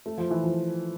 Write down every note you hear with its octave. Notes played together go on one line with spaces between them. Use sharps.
A3
F3
E3
F3